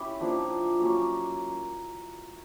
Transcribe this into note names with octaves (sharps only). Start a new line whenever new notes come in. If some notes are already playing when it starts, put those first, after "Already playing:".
Already playing: C#4 E4 G4
F3 A#3 D4
F#3 A#3 C#4